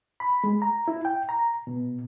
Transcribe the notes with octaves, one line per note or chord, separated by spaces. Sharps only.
B5
G#3
A#5
E4
G5
A#5
B2